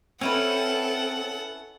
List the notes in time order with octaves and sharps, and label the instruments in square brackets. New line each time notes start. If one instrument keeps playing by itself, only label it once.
[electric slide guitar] C4 [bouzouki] C#4 E4 B4 [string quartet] A4 [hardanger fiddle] F#5